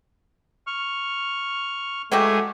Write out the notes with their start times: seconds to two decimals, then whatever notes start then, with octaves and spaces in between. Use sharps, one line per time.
0.67 C#6 F6
2.12 F#3 G#3 A3 F#4 G4